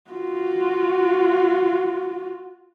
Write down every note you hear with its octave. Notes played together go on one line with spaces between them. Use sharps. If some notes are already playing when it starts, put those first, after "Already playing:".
F4 F#4